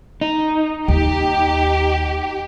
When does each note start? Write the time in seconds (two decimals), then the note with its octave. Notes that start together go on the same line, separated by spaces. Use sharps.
0.21 D#4
0.88 D#2 G4